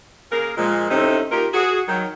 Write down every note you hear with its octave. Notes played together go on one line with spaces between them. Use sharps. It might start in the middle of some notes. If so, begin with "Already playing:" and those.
C#3 A#3 G#4 A#4
A#2 F3 G#3
A2 C3 A3 C4 C#4 D#4
A#3 D#4 F4 G4 A#4
F#4 G#4
D#3 F#3